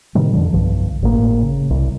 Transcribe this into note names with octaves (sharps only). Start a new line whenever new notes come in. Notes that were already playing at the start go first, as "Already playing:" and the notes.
A2 C3 D#3 G3
F2 D3 F3
B1 G2 F3
G#1 A2 A#3
C#3
C2